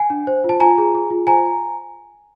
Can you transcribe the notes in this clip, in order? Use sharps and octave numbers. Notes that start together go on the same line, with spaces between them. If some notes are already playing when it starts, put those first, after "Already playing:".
Already playing: F#5 G#5
D4
C5
F4
A5
F4 G#5 A#5
G#4
G#4
F4
C5 G#5 A#5